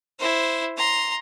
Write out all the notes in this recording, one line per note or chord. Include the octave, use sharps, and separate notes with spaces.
E4 C5
A#5 C6